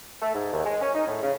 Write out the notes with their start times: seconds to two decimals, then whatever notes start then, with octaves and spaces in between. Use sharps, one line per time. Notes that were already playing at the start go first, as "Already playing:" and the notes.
0.22 A3
0.35 G#2
0.53 D#2
0.65 G#3
0.81 C#4
0.94 D#4
1.07 A2
1.23 C#3